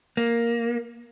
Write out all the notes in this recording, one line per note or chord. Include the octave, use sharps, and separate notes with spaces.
A#3